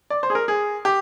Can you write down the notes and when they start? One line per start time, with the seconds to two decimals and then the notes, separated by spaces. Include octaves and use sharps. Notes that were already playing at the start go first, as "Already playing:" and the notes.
0.10 D5
0.23 C5
0.30 G#4
0.35 A#4
0.48 G#4
0.85 G4